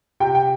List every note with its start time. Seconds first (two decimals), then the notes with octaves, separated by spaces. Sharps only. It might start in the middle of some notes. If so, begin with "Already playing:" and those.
0.20 C3 G5
0.35 G5